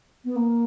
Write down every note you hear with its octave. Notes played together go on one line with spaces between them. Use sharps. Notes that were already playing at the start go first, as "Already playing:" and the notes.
B3
A#3